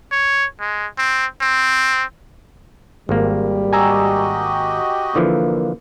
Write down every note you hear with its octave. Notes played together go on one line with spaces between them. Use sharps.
C#5
G#3
C4
C4
G#1 G3 A#3
F#4 G4 D#5 G#5 A#5 E6
D3 E3 F3 A#3